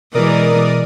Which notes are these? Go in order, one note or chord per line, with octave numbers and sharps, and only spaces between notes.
B2 E3 G#3 A#4 D5 D#6